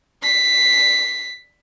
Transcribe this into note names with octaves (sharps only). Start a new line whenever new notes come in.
B6 C7